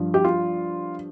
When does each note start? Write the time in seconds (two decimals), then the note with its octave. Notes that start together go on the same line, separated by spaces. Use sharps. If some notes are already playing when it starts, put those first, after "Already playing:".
Already playing: G2 F3
0.14 G4
0.24 F4